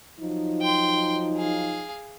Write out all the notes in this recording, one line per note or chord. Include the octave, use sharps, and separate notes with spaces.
F3 F#3 D#4
G5 C6
G#4 F5